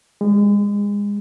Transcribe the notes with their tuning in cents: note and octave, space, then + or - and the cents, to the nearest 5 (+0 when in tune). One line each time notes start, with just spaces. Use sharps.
G#3 -30